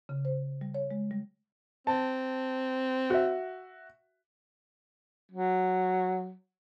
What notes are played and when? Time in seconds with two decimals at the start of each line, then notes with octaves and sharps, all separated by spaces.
0.09 C#3
0.25 C5
0.61 G3
0.74 C#5
0.91 G#3
1.11 G3
1.87 C4 A5
3.10 F#4 E5
5.32 F#3